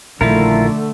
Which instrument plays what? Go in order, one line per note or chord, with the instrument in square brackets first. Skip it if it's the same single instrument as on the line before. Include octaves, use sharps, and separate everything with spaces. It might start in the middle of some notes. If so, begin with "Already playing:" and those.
[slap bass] A#1 D#3 [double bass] D3 A3 [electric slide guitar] E4 F4 A#4